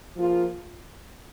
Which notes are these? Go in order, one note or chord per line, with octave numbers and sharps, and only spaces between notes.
F3 A#3 F4 G#4